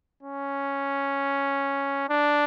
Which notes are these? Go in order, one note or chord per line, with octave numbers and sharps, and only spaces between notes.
C#4
D4